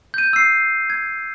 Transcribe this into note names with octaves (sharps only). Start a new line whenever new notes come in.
G6 D#7
E6 C7
G#6